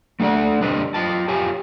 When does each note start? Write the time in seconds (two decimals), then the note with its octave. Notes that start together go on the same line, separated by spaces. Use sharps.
0.20 A3 D4 A4 D5 F#5
0.61 D3 G3 D4 B4 C5 D#5
0.94 F4 D#5 G5 A5
1.28 F4 G4 C#5 G#5